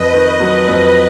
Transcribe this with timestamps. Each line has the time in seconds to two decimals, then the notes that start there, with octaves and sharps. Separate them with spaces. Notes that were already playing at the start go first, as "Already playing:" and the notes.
Already playing: F2 B4 D#5
0.13 D#3
0.40 F#3
0.68 F2